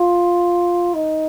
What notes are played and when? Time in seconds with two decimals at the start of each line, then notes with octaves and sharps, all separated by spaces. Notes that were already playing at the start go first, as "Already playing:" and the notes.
Already playing: F4
0.94 D#4